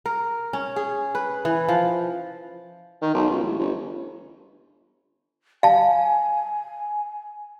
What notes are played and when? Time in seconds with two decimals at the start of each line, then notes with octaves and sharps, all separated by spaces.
0.06 A#4
0.53 C#4
0.76 G#4
1.15 B4
1.45 E3
1.69 F3
3.02 D#3
3.15 B1
3.31 C#2
3.43 A1
3.59 G1
5.63 F5 G#5 A5